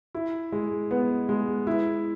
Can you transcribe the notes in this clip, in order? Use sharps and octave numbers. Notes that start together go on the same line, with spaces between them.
E4
G#3
B3
G#3
E4